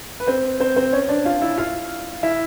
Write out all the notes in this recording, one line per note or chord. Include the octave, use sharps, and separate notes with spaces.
B4
C4 C5
C4 C5
C4 C5
C#4 C#5
D4 D5
F4 F5
E4 E5
F4 F5
E4 E5